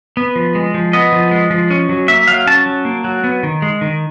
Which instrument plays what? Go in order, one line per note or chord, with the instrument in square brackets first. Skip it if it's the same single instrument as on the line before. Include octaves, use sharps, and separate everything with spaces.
[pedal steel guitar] B3
F3
G#3
F3
B3 D#5
F3
G#3
F3
C#4
F#3
A#3 E5
F#3 F5
C#4 A5
F#3
A#3
F#3
B3
D#3
G#3
D#3